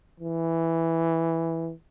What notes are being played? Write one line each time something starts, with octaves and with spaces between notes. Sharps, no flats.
E3